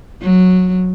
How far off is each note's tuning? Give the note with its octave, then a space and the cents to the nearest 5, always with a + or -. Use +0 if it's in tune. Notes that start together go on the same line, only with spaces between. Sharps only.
F#3 -10